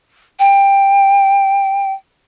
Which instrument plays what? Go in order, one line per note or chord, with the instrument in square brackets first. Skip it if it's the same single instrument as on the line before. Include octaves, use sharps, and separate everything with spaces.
[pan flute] G5